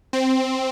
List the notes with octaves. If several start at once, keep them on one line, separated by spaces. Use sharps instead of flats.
C4